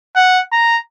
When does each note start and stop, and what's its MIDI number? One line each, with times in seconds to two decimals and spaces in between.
0.15 0.41 78
0.52 0.78 82